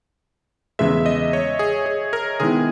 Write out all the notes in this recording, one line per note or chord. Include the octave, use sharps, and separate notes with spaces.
E2 C#3 G#3 E5
D#5
C#5
G#4
G#4
A#4
D#3 G#3 B3 E4 G#4